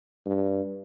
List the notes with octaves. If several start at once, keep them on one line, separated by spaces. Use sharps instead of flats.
G2